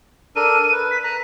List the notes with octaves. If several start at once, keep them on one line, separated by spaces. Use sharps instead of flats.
D4 A4 A#4 D#7
B4
B6
A#5 F#6